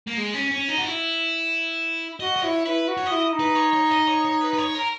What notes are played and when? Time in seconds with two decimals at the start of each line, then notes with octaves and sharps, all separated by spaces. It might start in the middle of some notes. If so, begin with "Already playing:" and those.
0.07 A#3
0.17 G#3
0.34 C#4
0.51 C#4
0.68 D#4
0.78 F#4
0.85 E4
2.20 F#4 D#5
2.36 D#5
2.42 E4 C#5
2.65 E4 B4
2.88 F#4
2.97 C#5
3.06 D#5
3.12 E4
3.33 D#4
3.40 B4
3.56 C#5
3.74 C#5
3.91 D#5
4.07 C#5
4.25 C#5
4.41 B4
4.53 B4
4.58 C#5
4.75 A#4